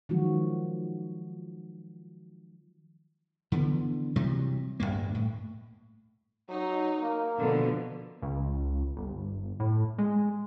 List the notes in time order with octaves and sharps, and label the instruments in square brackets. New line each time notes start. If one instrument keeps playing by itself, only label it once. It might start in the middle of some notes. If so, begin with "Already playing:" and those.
[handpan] D#3 F3 F#3 G#3 F4 F#4
[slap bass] D3 E3 A3 B3
C3 E3 F#3 G3
D1 C#2 G2 A#3
A2
[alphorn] F#3 [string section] D#4
[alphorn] A#3
[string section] B2 D3 F3
[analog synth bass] C#2
G1
A2
G#3